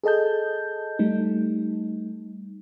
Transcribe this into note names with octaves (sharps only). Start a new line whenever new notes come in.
G#4 A4 D#5 A5 G6
G3 A3 D#4